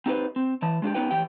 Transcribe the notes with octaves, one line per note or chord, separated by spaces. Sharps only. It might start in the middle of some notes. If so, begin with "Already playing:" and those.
C4 D#4 G4 G#4 B4 C5
C4
E3 A5
G#3 D4 F4 G4
B3 C#4 D#4 G4 B4 G5
F2 E3 G4 G5